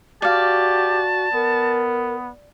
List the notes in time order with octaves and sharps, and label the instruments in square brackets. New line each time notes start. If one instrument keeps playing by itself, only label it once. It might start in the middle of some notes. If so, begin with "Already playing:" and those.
[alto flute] F#4 [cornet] G4 [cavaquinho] D5 F5 [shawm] A5
[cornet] B3 [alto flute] A#4